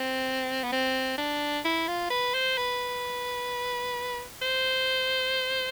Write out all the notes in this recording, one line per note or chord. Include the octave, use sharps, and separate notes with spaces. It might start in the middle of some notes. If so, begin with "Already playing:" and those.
Already playing: C4
B3
C4
D4
E4
F4
B4
C5
B4
C5